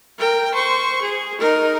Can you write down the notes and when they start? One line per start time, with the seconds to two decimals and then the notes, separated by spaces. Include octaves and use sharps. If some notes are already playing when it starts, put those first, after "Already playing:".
0.19 A#4 G5
0.54 C5 C#6
1.01 G#4
1.40 D#4 A#4